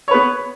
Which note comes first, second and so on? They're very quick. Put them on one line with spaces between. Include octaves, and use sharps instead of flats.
C#5 B4 B3